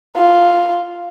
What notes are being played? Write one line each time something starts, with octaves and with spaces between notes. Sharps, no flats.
F4